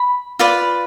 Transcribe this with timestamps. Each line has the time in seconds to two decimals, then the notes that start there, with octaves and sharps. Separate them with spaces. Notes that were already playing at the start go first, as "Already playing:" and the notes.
Already playing: B5
0.39 F4 B4 D5